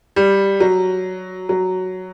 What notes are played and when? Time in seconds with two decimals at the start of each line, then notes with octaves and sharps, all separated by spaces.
0.16 G3
0.60 F#3
1.49 F#3